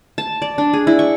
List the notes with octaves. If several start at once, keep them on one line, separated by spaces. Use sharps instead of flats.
A5
D5
D4
G#4
E4
C#6